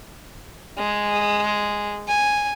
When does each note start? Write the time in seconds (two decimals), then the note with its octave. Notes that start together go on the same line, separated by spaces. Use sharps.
0.78 G#3
2.08 G#5